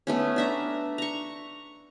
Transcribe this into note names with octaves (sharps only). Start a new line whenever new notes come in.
A3 B3 C#4
D4 E5 A#5
A#5 C#6